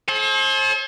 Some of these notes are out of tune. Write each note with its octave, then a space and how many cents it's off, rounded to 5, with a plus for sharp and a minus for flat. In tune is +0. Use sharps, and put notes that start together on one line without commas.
A4 -40 C5 +40